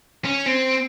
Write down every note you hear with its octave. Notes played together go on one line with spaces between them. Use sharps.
C#4
C4